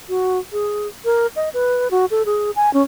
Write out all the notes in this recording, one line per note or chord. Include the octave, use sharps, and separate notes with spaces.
F#4
G#4
A#4
D#5
B4
F#4
A4
G#4
G#5
C#4